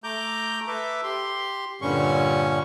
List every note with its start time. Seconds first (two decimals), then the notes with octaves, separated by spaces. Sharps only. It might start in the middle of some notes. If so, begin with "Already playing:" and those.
0.04 A3 A#5 D6 G6
0.67 A4 B4 E5 D6
1.04 G4 C6
1.81 G2 A#2 D3 G3 C#4 C#6